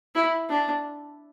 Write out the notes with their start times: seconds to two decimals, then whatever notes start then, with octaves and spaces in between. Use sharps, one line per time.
0.15 E4
0.49 D4